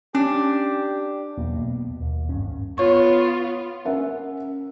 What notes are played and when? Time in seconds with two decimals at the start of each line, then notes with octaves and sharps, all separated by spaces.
0.15 C#4 D4 G4
1.38 B1 E2 A#3
1.56 B2
2.00 D#2
2.29 D1 G#1 G2 C#4
2.78 B3 F4 C#5 C#6
3.85 C#4 A#4 E5 F#5